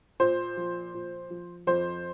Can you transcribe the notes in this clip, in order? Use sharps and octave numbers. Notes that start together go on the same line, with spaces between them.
A#2 C5
F3
A#2
F3
F2 C5